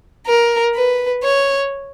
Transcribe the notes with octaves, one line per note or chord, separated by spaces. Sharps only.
A#4
B4
C#5